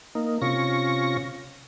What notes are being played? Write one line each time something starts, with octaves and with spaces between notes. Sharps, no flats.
A#3 D#4
C3 C#4 F4 C#6 A#6